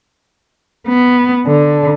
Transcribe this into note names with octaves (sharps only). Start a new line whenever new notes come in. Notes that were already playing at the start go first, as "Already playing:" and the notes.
B3
D3